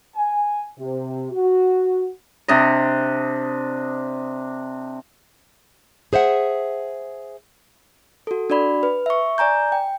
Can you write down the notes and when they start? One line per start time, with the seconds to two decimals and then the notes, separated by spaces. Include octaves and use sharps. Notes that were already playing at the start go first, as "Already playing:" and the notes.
0.15 G#5
0.78 C3
1.32 F#4
2.48 C3 D4 D#5
6.13 G#4 C5 E5 F#5
8.27 F#4 A4
8.50 D4 F#4 D5 B5
8.83 B4
9.06 E5 C#6
9.38 D5 G#5 A#5 G6
9.72 G5